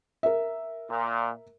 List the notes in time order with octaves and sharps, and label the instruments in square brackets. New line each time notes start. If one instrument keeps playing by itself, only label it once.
[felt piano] A#4 E5
[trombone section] A#2